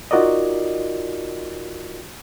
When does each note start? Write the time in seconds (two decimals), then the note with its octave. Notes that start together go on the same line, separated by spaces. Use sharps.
0.11 D#4 F4 F#4 A#4 D5 D#5